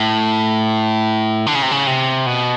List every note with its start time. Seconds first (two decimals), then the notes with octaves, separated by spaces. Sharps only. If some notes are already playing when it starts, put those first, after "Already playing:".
Already playing: A2
1.46 D3
1.55 C#3
1.62 C3
1.71 C#3
1.87 C3
2.26 B2